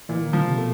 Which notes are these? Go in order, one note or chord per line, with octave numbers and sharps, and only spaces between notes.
A#2 E3
D#3
D3 F3
C3
B2 A3